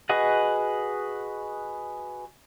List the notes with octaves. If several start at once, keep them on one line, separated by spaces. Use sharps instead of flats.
F#4 G#4 B4 D#5 F#5